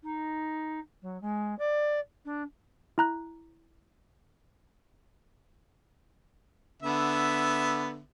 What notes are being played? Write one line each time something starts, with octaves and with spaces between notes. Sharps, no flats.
D#4
F#3
G#3
D5
D4
E4 A#5 F#6
D3 B3 E5